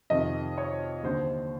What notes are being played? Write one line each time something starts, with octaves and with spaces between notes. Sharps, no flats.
F2 C3 D#3 D#5
C#5
D#2 D3 C5